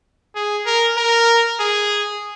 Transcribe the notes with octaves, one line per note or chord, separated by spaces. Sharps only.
G#4
A#4
A#4
G#4